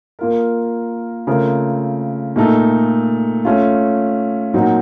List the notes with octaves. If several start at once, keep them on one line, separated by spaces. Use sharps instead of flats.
A#3 F4 A#4
C#3 A3 C4 F4 A#4
A#2 A3 D#4 A4
A3 C#4 F4
A#2 F#3 C4 D#4 F#4